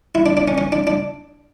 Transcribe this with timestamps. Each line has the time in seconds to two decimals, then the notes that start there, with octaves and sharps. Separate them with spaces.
0.15 E4
0.26 D4
0.37 D4
0.48 C#4
0.58 C#4
0.72 D4
0.87 D4